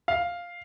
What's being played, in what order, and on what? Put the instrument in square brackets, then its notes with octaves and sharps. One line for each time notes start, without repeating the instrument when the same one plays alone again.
[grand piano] F5